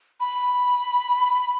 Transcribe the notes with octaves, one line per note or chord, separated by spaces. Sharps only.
B5